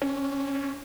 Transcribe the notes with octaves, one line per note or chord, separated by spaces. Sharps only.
C#4